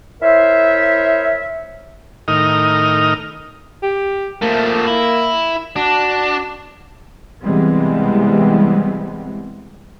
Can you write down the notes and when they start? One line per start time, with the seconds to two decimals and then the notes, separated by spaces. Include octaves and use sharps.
0.21 E4 A#4 C5 C#5 E5
2.28 A2 D#3 D#4 A#4 D#6 F6
3.83 G4
4.42 F3 A3 A#3
4.87 E4
5.76 D4 F#4
7.43 C3 E3 G3 G#3 B3 C4